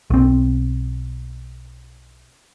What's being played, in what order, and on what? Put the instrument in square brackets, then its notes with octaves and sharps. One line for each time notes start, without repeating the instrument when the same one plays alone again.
[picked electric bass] B1 C4